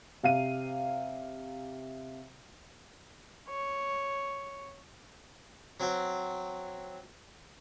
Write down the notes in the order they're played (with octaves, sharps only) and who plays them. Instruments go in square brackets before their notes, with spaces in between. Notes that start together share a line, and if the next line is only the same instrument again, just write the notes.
[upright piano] C3 F5 D#7
[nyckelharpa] C#5
[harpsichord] F#3 C4